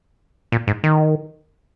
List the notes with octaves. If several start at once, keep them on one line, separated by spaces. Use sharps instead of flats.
A#2
G#2
D#3